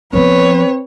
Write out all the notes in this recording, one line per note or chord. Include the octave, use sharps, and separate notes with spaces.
F3 B3 C4 B4 C#5